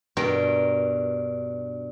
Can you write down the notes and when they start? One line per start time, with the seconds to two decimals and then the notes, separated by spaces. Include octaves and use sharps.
0.17 G2 B2 A#4 G5